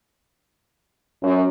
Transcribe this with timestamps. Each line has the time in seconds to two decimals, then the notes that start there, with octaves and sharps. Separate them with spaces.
1.23 F#2